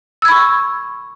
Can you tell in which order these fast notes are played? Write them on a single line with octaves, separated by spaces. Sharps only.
E6 G#6 B5 C#6